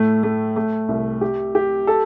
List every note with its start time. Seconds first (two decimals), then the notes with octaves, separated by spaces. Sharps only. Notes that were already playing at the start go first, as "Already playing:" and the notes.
Already playing: A2 A3
0.23 A3
0.56 A3
0.89 C2
1.21 G4
1.55 G4
1.87 A4